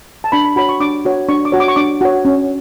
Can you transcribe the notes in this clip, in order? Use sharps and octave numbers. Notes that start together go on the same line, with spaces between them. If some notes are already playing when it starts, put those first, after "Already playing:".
A5
D4 B5
B5
F#4 C#5 B5
C#6
D4 D6
F#4 C#5
D4 C#6
D6
F#4 C#5
D6
C#6
D4 D6
F#4 C#5
C#4